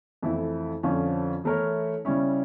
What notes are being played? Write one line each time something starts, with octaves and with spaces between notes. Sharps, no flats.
F2 E3 A3 E4
F2 D3 F3 C#4 F4
E3 A3 E4 A#4 C#5
C#3 G3 C#4 E4